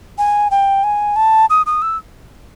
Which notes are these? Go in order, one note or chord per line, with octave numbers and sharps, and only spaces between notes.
G#5
G5
G#5
A5
D#6
D#6
E6